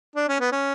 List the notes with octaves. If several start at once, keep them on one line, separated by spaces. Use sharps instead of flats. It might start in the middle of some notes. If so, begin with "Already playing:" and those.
D4
C#4
B3
C#4